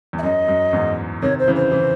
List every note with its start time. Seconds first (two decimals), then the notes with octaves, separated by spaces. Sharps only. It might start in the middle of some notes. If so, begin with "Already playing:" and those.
0.13 E2
0.18 E5
0.23 F#2 D#5
0.48 F#2
0.73 E2 G#2
1.22 C3 D#3 C#5
1.39 C5
1.48 C#3 E3
1.56 C5
1.72 C#3 E3